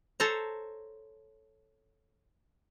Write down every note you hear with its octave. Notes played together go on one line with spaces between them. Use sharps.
A4 C5 C#5 A5 A#5